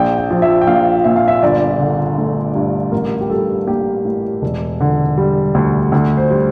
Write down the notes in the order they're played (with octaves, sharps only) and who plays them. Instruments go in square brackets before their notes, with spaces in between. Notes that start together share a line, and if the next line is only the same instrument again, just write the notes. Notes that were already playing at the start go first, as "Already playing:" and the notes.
Already playing: [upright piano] A#1 G5
G5
F3
E5
G5
A#1 F5
A#2 E5
F5
E5
G1 D5
D3
A3
G2
A1 A#4
G4
G3 A4
A#3 G4
A2
E1
D3
G3
D2
D2
C5
G3